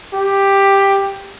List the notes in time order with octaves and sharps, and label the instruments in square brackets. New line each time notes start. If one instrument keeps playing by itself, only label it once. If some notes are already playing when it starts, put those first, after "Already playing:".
[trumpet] G4